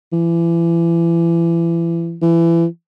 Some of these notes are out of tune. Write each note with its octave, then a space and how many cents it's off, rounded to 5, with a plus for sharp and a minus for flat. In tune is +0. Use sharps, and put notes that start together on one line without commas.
E3 +30
E3 +25